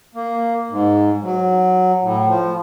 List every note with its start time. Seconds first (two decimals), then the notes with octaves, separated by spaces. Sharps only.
0.15 A#3
0.70 G#2
1.22 F#3
2.02 A2
2.26 F3